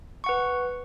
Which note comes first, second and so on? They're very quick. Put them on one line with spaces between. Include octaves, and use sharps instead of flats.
C#6 F#5 B4